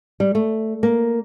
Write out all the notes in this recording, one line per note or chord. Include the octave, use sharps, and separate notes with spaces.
G3
A3
A#3